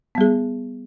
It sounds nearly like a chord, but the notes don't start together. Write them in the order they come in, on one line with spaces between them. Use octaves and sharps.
B3 G3 G#4